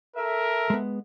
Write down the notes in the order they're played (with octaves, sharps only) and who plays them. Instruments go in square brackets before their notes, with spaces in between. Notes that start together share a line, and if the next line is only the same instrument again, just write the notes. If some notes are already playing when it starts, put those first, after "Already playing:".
[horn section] A4 E5 [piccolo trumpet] A#4
[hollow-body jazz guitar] G#3 B3